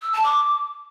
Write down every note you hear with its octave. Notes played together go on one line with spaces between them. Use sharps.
E6
A5
D6